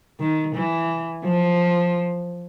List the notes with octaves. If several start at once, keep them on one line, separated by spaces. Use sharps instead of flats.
D#3
E3
F3